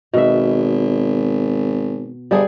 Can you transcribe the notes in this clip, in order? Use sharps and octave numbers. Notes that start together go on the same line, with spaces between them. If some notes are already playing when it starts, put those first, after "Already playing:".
G#1 B2 E5
G1 G3 G#4